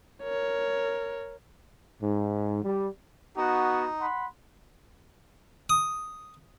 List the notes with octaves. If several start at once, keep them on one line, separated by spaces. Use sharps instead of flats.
A#4 C#5
G#2
G3
B3 D#4 F#4
F#5 B5 C6
D#6